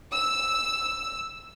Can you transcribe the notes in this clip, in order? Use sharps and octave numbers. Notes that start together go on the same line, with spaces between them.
E6